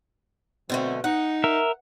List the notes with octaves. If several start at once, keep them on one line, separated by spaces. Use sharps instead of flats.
B2 D3 F#3 A3 C4
D#4 F#5
A#4 E5